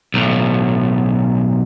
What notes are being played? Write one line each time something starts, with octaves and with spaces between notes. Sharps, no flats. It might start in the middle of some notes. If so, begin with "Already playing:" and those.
B1 A2